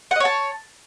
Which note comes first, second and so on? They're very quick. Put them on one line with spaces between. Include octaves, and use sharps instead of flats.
F#5 D#5 C#5 A5